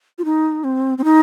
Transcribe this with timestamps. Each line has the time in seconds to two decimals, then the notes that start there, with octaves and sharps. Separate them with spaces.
0.18 F4
0.25 D#4
0.64 C4
0.98 C4
1.04 D#4